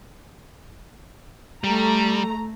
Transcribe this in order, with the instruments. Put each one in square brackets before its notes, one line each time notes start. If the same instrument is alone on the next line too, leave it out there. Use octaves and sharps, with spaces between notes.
[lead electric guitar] G3 [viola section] A3 A#5